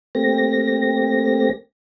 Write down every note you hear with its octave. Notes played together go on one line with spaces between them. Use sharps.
A3 A#3 C4 G4 A#6